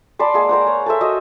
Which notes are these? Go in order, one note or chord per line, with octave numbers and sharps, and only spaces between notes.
D5 A5 B5 C6
G#3 A#3 G#4
A#4 C5 F#5
C#5
A4 C5 E5
F#4 D#5